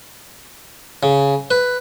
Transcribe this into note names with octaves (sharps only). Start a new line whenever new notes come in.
C#3
B4